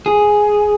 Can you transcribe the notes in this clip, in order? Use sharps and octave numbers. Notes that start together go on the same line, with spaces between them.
G#4